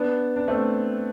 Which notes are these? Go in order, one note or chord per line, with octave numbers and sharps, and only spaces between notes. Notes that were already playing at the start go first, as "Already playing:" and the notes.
Already playing: B3 D4
D4
A3 C4